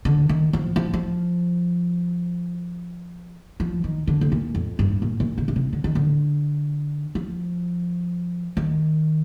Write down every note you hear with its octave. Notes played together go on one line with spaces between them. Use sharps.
D3
D#3
F3
F3
F3
F3
D#3
D3
A2
A#2
F2
G2
A#2
A#2
D3
D3
C3
D3
D#3
D3
F3
D#3